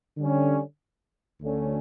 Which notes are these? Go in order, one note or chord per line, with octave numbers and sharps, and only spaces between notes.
D3 G3 C#4
D2 D3 A3 C#4